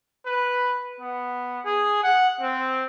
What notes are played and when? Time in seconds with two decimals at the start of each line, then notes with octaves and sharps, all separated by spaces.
0.26 B4
1.01 B3
1.65 G#4
2.04 F#5
2.41 C4